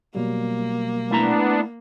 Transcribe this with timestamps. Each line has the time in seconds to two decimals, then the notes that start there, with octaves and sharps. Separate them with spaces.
0.15 B2 F#3 G3 A#3
1.11 A3 B3 D4 E4 A#5